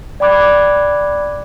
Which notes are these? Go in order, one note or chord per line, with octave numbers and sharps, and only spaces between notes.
D5 G5 B5 D6 F#6 G#6